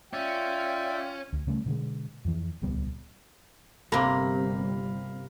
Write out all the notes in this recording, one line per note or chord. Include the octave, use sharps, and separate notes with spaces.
C#4 F4 D5 E5 G5
D2
C#3 G3 A3 C#4
B2 D3 G#3
F2 E3
D#1 C#2 G3 B3
G1 C3 G3 A#3 F5 B5 A#6